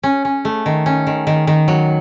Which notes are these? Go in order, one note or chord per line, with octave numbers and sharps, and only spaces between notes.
C#4
C#4
A3
D#3
C#4
D#3
D#3
D#3
F#3